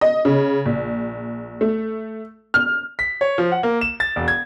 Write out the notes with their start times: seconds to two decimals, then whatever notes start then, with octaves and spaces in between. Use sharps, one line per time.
0.01 D#5
0.25 C#3
0.66 A#1
1.61 A3
2.54 F6
2.99 B6
3.21 C#5
3.38 F3
3.52 F#5
3.63 A#3
3.81 E7
4.00 A6
4.16 E1
4.28 G#6